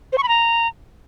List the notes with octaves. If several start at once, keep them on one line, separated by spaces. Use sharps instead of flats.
C5
C#6
B5
A#5